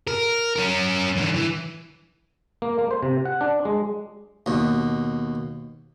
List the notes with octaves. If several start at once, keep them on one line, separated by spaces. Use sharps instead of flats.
A#4
C#4 A#4
D3 E3
E3
A#3
A#3
C5
C3
F#5
D4
G#3
D#2 B2